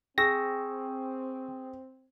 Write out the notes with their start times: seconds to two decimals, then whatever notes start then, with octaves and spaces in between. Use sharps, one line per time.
0.18 C4 G#4 G5 C#6 E6 A#6